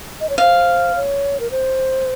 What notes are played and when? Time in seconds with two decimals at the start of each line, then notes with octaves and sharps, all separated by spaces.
0.21 D#5
0.30 C#5
0.38 C5 F5
0.95 C#5
1.40 A#4
1.51 C5